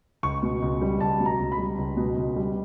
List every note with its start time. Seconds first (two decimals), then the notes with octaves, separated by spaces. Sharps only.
0.23 C#2 C#6
0.43 B2
0.62 C#2
0.81 G3
1.00 C#2 A5
1.20 B2
1.26 A#5
1.39 C#2
1.52 B5
1.58 G3
1.78 C#2
1.97 B2
2.16 C#2
2.36 G3